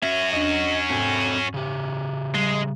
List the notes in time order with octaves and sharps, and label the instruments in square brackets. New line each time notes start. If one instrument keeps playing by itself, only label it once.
[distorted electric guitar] C#4 F#4 [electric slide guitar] E5
[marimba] E2 D4 [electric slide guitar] D#5
[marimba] G#2 [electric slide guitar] C4 A4 G#5
[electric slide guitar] C#3 G4
[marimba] G3 [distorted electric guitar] G#3